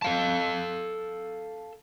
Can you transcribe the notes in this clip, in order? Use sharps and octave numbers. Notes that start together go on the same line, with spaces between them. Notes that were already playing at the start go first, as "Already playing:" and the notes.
A4 F5 A5